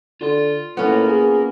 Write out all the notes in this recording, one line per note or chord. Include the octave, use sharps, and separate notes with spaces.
D3 F4 C6
A2 A#3 B3 C#4 A#4
G#4